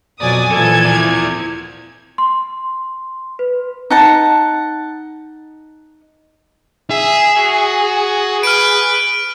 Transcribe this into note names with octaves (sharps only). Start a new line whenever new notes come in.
F2 B2 F#3 D5 G#5 D#6
A#2 E3 F3 A4 G#6
E4 D5
C6
B4
D#4 F#5 A5
G#4 E5
F#4
B4 F6 D7